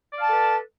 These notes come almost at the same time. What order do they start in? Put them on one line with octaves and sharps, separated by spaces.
D5 F5 A5 A4 B4